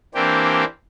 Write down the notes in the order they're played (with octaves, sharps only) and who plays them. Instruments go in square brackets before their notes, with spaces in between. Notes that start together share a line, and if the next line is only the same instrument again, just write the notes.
[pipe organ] E3 A#3 C4 D4 G4